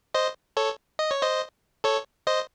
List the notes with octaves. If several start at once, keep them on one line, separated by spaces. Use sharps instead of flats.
C5 D#5
A4 C#5
D#5
C#5
C5 D#5
A4 C#5
C5 D#5